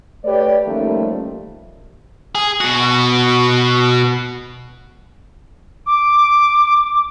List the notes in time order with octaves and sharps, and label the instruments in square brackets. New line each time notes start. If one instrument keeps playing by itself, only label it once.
[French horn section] A3 G4 B4 C#5 D5
D#3 F3 G3 A3 A#3 C#4
[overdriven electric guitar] G#4
B2 F#4
[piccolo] D6